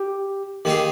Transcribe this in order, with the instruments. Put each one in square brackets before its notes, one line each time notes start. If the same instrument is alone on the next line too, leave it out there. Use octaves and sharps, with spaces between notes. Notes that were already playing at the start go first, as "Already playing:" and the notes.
Already playing: [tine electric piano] G4
[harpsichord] D#3 A#3 D#4 G#4 [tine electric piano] G4